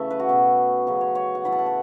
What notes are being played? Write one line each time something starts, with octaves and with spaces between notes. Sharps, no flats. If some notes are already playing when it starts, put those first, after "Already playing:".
Already playing: C#3 E3 A3 C#4 E5 A5
B4
F#4
B2 B3
C#3 F#3 C#4
C#5
C#5
F#5
A2 E3 A3 B5
A5
F#5
A5